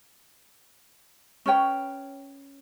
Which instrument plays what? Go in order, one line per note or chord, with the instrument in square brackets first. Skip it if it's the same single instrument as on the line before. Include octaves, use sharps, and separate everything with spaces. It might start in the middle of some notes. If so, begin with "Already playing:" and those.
[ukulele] C#4 B4 C#5 G5